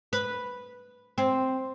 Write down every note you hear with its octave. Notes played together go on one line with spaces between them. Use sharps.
B4
C4